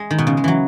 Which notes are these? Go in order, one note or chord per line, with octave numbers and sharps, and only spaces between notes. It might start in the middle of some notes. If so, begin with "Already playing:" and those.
Already playing: G#3
D#3
B2
C#3
G#3
E3 F#3